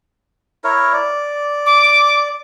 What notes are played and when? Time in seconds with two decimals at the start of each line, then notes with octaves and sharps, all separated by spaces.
0.64 E4 A#4 C#5
0.93 D5
1.66 D6